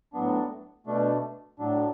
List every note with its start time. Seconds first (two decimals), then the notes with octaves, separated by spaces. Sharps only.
0.14 A2 F#3 B3 D4
0.87 B2 A3 D4
1.59 A2 F#3 D4